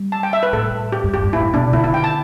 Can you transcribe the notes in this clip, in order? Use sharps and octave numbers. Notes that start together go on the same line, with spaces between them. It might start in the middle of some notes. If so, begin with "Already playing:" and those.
Already playing: G3
A5
G5
E5
B4
A2 A4
G4
G2
E2 G4
G2
A2 E4
B2 D4
D3 E4
E4
G5
A5